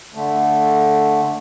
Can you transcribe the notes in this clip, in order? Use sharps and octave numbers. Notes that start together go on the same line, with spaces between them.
D3 A3